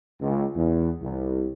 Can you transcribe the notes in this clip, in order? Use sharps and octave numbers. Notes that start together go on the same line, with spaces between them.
C#2
E2
C2